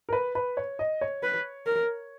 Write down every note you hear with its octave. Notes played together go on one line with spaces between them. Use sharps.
A#4
B4
B4
C#5
D#5
C#5
B4
A#4